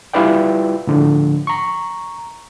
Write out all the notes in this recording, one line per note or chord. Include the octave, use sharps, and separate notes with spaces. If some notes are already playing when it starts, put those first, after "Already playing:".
G3 E4 F4 B4 D5 G5
A2 D3 F3
A#5 C#6